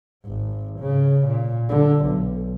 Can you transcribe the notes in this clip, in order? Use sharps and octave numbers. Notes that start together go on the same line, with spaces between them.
G#1
C#3
A#2
D3
B1